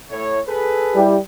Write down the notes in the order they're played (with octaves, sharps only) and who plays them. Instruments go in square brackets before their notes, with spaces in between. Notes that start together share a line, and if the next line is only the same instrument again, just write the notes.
[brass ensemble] A2 C#5
G#4 A4 B4
[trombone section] G3 E4 G4